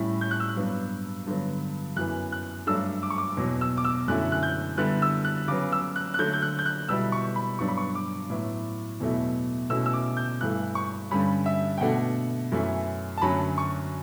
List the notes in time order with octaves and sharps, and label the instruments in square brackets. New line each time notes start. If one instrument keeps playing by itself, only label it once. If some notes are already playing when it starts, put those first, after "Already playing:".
Already playing: [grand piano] A2 G3 C#4 E4
G6
F#6
E6
F#6
G2 F#3 B3 D4
G2 D3 F#3 B3
F#2 E3 B3 F#6
F#6
G2 F#3 A3 D4 E6
D6
C#6
D6
E2 B2 F#3
E6
D6
E6
F#2 D3 A3 C#4 E4 F#6
F#6
G6
D3 G3 B3 E4 F#6
E6
F#6
C#3 F#3 B3 D6
E6
F#6
F#6
D3 F#3 A3 G6
G6
F#6
G6
F#6
B2 G3 B3 E4 E6
C#6
B5
G2 F#3 B3 D4 C#6
B5
C#6
D6
A2 F#3 B3 E4
E2 B2 F#3 A3 E4
B2 A3 C#4 E4 E6
E6
D6
G6
G2 E3 A3 F#6
C#6
G2 D3 G3 C#4 B5
E5
G5
B2 A3 D4 F#5
F#2 E3 A3 C#4 E4
A5
F#2 D3 F#3 A3 C#4 B5
C#6